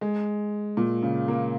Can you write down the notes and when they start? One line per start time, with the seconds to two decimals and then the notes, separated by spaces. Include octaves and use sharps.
0.01 G#3
0.77 A#2
1.03 C#3
1.28 A#3